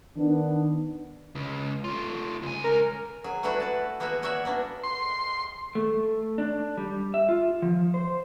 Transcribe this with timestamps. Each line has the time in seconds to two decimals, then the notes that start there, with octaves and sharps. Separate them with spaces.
0.17 D#3 B3 D4
1.35 C#2
1.84 A3 F4
2.42 C#2 G#5
2.64 A#4
3.24 F#3 G#4
3.43 A3 B3 D4 E4 F#4 B4
3.60 F#4 A5
4.00 A#3 B3 F#4 G#4 C#5 E5
4.22 A#3 F#4 C#5 D5 E5
4.45 A#3 B3 D4
4.84 C6
5.75 A3
6.38 D4
6.77 G3
7.14 E5
7.29 F4
7.62 F3
7.94 C5